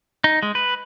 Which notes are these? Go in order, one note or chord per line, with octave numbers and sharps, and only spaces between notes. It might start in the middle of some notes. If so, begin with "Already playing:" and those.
D#4
G#3
B4